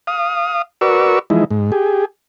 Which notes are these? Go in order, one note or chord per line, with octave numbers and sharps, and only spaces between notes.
F5 D#6
F#4 A#4 B4 D5 C#6 E6
E3 F3 G#3 D#4 E4
G#2
G4 G#4